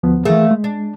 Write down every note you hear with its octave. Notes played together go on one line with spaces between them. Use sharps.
D2 F3 B3
E3 A3 A#3 G#4
G#3
D4